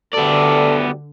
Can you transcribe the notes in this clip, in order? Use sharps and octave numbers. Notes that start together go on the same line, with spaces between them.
D2 D3 G3 B3 A4 D5